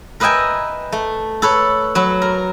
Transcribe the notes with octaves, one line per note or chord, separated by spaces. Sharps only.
A#4 B4 D#5 E5 G5 G#5
A3
A4 B4 C#5
F#3 B4
A#4